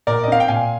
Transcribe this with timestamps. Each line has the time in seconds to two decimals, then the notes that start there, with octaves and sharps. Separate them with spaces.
0.07 A#2 A#4 D5
0.24 D#5
0.28 C4 F5
0.40 G5
0.48 A#2 F5 G#5